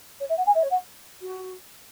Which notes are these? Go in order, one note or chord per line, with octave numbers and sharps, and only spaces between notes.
C#5
E5
F#5
G#5
E5
C#5
F#5
F#4